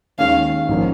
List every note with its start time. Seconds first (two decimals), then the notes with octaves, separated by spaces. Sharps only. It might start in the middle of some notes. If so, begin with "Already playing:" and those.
0.19 D#2 D#3 G#3 C#4 F5
0.68 A#1 G#2 F3 A#3 C#4